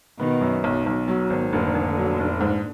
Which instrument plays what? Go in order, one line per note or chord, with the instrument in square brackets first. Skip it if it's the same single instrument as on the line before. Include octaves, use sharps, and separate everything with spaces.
[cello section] B2 D#3 [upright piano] B3
[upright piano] F#2
[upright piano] B1 [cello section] B2
[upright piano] B1
F#3
G#1
[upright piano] F1 [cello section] A#2 D3
[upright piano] F1
F#3
F1
G#2